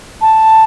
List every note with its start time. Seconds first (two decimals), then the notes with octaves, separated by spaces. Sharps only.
0.21 A5